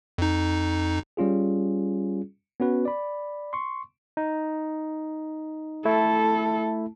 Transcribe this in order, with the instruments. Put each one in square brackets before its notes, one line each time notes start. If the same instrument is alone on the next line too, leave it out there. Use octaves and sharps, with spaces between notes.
[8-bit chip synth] F2 D#4
[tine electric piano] G3 C#4 F4 G#4
B3 C#4 F#4 B4
D5 B5
C6 C#6
D#4
[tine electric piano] A3 E4 [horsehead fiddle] A4